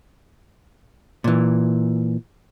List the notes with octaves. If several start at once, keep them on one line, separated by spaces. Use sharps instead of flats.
A#2 E3